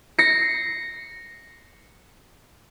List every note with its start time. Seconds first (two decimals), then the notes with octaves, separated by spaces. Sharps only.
0.19 A#6 C7 C#7